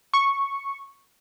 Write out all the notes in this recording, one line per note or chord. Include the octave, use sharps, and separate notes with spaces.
C#6